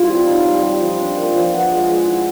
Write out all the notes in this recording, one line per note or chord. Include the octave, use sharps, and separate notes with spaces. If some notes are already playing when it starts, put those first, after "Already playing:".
Already playing: G3 E4 F4
C4
D#4
G3
G3
F3
D4
A#3
F3
B3
G#3
G#3
E4